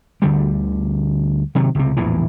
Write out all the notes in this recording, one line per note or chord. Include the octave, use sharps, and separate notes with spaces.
D2 D3 G3
C3 D#3 F#3
C#2 C3
A#1 E2 A2 E3